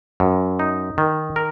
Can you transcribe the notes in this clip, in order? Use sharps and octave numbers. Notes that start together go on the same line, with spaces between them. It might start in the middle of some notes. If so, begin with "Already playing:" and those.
F#2
D#4
D#3
A#4